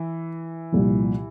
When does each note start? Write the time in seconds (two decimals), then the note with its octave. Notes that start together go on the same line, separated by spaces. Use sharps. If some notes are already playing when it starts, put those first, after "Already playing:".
Already playing: E3
0.72 C2 A#2 F3